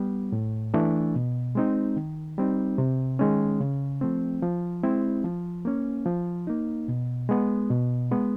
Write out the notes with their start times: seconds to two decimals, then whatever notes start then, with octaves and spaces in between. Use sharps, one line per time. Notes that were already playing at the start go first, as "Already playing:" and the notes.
Already playing: G3 B3
0.32 A2
0.74 E3 A3 D4
1.15 B2
1.55 G#3 C4 D#4
1.96 D#3
2.38 G3 C4 D#4
2.78 C3
3.19 D#3 G#3 C#4
3.60 C#3
4.01 F3 A3 C4
4.42 F3
4.83 G#3 C4 E4
5.25 F3
5.65 A#3 C#4
6.06 F3
6.47 A#3 D#4
6.88 B2
7.29 G#3 B3
7.70 B2
8.11 G#3 B3